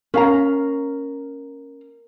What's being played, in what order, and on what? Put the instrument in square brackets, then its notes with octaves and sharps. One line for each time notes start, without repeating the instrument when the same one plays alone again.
[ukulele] C#4 F5 A#5 [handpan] A#4